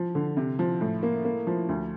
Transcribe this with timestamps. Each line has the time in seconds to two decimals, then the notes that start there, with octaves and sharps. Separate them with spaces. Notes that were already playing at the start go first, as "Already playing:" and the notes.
Already playing: F3
0.15 D3
0.37 C3
0.59 F3
0.81 A2
1.03 A#3
1.25 A#3
1.47 F3
1.69 D2